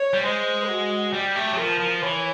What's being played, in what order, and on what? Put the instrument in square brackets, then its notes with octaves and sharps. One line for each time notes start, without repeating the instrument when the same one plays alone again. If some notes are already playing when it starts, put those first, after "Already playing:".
Already playing: [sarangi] C#5
[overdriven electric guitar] G3
[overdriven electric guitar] G#3 [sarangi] C5
[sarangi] F#4
[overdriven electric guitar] G3 [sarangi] G4
[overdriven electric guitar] A3
F#3
[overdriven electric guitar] F3 [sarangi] A#4
[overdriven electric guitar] F3
[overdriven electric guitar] E3 [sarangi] C#5